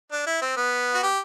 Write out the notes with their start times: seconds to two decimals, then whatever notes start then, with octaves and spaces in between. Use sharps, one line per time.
0.12 D4
0.26 E4
0.42 C4
0.57 B3
0.94 F#4
1.03 G4